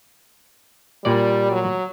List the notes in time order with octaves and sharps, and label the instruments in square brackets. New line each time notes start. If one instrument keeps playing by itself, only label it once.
[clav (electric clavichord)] A#2 D5 [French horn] G3
[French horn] F#3